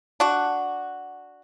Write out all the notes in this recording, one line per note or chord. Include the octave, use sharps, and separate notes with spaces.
D4 F#4